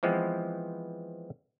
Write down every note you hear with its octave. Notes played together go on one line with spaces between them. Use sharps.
E3 F3 G#3 B3 C4